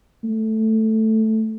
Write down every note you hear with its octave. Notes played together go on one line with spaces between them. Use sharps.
A3